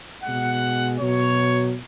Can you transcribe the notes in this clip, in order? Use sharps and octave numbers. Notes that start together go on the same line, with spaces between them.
B2 G#3 F#5
B2 F#3 C#5